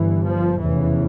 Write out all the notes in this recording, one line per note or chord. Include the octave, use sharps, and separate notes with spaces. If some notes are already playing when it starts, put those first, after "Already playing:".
Already playing: G1 G2 E3
F3
F1 E2 C#3 E3